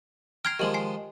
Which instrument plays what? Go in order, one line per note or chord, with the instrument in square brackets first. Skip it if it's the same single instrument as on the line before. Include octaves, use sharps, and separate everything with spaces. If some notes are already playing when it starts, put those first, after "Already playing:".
[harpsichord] G5 A#5 C6 [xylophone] F6 G#6 C7
[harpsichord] D#3 F3 G#3 [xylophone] G4 F#7
[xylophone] G#5 C7